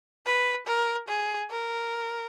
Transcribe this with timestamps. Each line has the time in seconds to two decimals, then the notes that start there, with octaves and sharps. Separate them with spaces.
0.26 B4
0.67 A#4
1.08 G#4
1.51 A#4